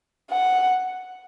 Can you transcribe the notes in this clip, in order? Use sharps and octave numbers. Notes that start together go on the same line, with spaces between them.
F#5